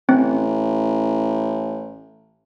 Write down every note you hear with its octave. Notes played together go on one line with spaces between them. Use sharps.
A1 C4